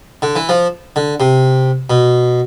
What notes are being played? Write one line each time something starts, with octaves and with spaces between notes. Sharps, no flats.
D3
E3
F3
D3
C3
B2